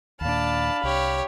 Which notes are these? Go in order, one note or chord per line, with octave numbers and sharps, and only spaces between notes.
D#2 A#2 D4 F5 A5 B5
C2 G4 C#5